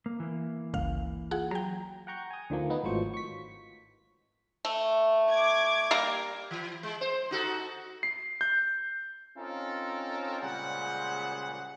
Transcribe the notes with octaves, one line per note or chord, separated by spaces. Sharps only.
A#3
E3 A#3
G1 C#2 F5
F4 G#4 F#5
F#3 G5 A#5
F#5 G5 A#5 C#6 G6
G#5 D#6
D2 D3 D#3 F3 A#3
D#3 B3 D#4
G#1 A2 F3 F#3 C5 C#6
C#6 B6
A3
D6 G#6
G3 A#3 A#4
E3
G#3
C5
D#4 F#4 A4
C7
G6
C4 C#4 D#4 F4 A4 A#4
A#2 C#3 G3 G#3 C5 F#5